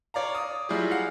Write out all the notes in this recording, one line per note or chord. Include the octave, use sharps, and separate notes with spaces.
C#5 D5 F5 A#5
D6 D#6
F#3 G3 E4 F4 G#4
F5 F#5 F6 C7